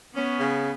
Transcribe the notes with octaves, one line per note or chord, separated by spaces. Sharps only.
B3 C#4
C#3